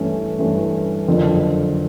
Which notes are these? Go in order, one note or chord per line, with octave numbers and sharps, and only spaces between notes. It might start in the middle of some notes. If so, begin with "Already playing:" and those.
Already playing: G2 E3 A3 C#4
G2 E3 A3 C#4
F#1 F2 D3 F3